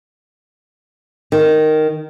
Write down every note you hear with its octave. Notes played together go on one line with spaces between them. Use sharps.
D#3